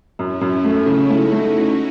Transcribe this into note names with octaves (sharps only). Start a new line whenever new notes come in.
F#2 C#4 E4
F#2
C#4 E4
A3
C#3 D#4 F#4
A3
C#4 E4
A3